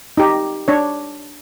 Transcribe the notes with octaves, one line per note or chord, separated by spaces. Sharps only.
D#4 G4
D4 C#5